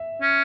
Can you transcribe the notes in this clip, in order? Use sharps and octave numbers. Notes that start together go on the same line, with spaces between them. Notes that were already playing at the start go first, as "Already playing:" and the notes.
Already playing: E5
C#4